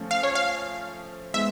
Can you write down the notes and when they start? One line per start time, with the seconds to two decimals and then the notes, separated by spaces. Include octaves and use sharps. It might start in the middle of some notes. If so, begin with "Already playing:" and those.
Already playing: F3 A3 C#4
0.11 F5
0.23 C#5
0.35 F5
1.34 G#3 B3 D#4 E5